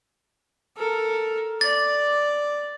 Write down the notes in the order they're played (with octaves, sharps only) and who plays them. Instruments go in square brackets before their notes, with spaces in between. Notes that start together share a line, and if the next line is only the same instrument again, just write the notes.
[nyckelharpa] A4 A#4
[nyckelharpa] D5 [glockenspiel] A6